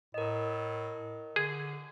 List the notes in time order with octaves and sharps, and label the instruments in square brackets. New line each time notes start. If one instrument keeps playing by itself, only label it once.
[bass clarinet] A2 [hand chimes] A#4 D#5
[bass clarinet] D3 [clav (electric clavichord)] G#4